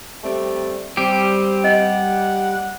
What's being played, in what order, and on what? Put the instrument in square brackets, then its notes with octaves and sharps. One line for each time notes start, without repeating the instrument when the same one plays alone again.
[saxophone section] G3 A3 C4
[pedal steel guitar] G3 G4 [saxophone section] C4
[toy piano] D#5 [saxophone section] F#5